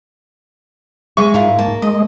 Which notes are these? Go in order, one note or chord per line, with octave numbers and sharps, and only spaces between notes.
G#3 G#4 E5 C#6
G#2 E4 F4 A#4
A#3 A5
G#3 D#5